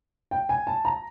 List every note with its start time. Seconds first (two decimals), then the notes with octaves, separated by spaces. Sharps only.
0.31 G5
0.49 G#5
0.67 A5
0.85 A#5